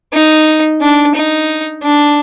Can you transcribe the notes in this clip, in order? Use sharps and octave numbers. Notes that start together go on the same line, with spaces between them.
D#4
D4
D#4
D4